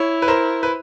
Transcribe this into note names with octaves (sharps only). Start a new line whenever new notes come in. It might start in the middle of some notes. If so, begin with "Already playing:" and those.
Already playing: E4 C#5
B4
A#4 C5
B4